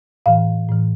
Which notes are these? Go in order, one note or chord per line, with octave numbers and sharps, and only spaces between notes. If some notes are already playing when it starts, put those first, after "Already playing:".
A2 E3 F5
A2 E3